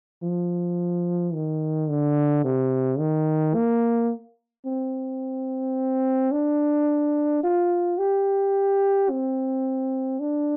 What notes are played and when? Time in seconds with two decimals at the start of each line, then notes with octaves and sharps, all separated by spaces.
0.23 F3
1.34 D#3
1.90 D3
2.44 C3
3.00 D#3
3.55 A#3
4.66 C4
6.32 D4
7.44 F4
7.98 G4
9.10 C4
10.20 D4